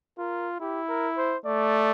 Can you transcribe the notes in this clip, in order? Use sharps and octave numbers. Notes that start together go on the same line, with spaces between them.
F4 A#4
E4 G4
A#4
C5
A3 D5